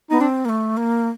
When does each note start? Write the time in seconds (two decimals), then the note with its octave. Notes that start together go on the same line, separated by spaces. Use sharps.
0.10 B3 D#4
0.21 C4 D4
0.45 A#3
0.49 A3
0.77 A#3